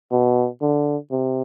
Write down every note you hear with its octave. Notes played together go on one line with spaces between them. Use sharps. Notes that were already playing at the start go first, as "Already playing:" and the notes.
B2
D3
C3